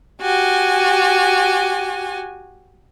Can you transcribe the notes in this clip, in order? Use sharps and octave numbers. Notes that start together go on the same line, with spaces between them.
F#4 G4 G#5